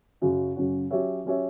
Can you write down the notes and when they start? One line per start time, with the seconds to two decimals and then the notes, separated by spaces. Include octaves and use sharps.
0.22 F#2 C#3 F#3 C#4 F#4
0.56 F#2 C#3 F#3 C#4 F#4
0.91 F#3 C#4 G4 C#5 E5
1.24 F#3 C#4 G4 C#5 E5